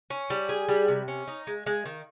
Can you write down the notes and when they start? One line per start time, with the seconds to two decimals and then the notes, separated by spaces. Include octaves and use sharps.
0.10 C#4
0.30 G3
0.49 G#4
0.69 G3
0.88 C3
1.08 C#4
1.28 D#4
1.47 G#3
1.66 G#3
1.85 D#3